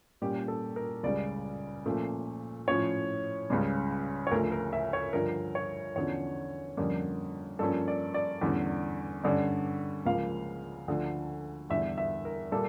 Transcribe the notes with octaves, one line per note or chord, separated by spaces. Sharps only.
A#2 G3 A#3 C#4 G4
A4
A#4
C#2 C#3 G3 D5
A#2 F3 A3 C#4
A2 F3 C#4 C#5
C#2 C#3 G3 C#4
C#5
D2 C#3 F3 A3 A#4
A#4
E5
C#5
G2 D3 F3 A#4
C#5
E2 D3 F3 C#4 C#5
F2 D3 G3 A#3 C#4
G2 F3 A#3 C#4 A4
D5
D5
E2 D3 G3 C#4
G2 D3 G3 C#4
C#2 C#3 F3 A#3 F5
D2 D3 F3 A3
E2 D3 G3 E5
E5
A#4
A#2 G3 A#3 A4